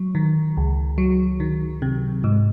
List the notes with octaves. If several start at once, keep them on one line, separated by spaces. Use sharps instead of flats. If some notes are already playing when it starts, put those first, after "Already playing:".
Already playing: F#3
D#3
C#2
F#3
D#3
C3
G#2